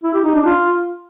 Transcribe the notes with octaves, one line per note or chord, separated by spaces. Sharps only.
E4
G4
D#4
D4
F4